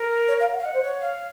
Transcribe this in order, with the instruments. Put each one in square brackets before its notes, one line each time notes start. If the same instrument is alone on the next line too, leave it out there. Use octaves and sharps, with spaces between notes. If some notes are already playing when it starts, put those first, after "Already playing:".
Already playing: [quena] A#4
[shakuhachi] C#5
F5
F#5
[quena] F5
[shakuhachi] D#5 [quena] F#5
[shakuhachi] C5
C#5
[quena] F5